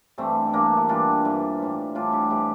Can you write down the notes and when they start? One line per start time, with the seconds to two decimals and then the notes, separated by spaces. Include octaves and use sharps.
0.18 G2 E3 G3 A3 C4
0.48 E4
0.53 G2 E3 G3 A#3 D4
0.77 E4
0.89 G2 E3 G3 D4 F4
1.24 G2 E3 G3
1.60 A2 E3 G3
1.95 A2 E3 G3 D4 F4
2.12 E4 G4
2.30 A2 E3 G3 E4 G4